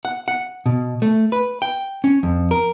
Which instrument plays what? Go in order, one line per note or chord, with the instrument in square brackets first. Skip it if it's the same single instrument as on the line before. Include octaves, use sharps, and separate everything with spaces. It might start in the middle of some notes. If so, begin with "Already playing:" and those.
[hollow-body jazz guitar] F#5
F#5
B2
A3
B4
G5
C#4
F2
A#4